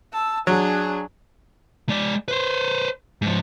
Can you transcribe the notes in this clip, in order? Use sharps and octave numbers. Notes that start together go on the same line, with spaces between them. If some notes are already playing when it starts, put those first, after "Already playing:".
A5 E6
F#3 D4 G#4
G#3 D5
B4 C5
G#2 F3